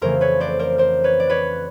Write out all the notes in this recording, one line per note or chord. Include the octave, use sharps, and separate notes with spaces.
F2 C#3 E3 A3 A#4 C5
B4 C#5
C5 D5
A#4 C5
A#4 C5
B4 C#5
D5
B4 C#5